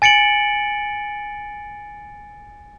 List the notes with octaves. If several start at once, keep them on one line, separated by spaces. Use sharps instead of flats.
G#5 A6 C#7 D7 F#7